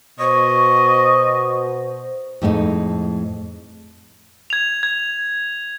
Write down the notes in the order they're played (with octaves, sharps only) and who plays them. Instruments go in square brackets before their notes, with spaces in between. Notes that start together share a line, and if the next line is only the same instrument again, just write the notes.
[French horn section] B2 C5 [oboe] D#5 [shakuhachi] C#6
[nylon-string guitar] F2 A2 G#3 B3 D#4
[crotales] G#6 F7
G#6